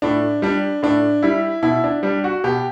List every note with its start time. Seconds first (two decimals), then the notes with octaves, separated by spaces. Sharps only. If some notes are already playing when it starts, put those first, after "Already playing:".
0.02 A2 D4
0.42 G3 D4
0.83 A2 D4
1.22 G3 E4
1.63 B2 E4
1.84 D4
2.03 G3 D4
2.24 F#4
2.44 B2 G4